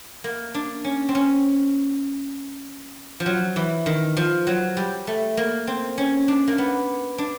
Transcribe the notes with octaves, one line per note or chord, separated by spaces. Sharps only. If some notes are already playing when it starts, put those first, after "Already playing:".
A#3
D4
C#4
C4
C#4
F3
F#3
E3
D#3
F3
F#3
G3
A3
A#3
C4
C#4
D4
A#3
B3
D4